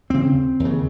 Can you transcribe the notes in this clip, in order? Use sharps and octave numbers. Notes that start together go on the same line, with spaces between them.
D#2 C#3 C4
D#2
C#3